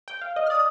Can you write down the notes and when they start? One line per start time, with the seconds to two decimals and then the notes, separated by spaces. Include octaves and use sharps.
0.08 G5
0.21 F5
0.36 D#5
0.46 F6
0.50 D5 D#6